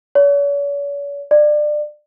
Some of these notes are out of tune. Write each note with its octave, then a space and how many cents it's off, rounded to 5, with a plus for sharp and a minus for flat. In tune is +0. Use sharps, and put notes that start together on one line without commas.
C#5 +45
D5 +25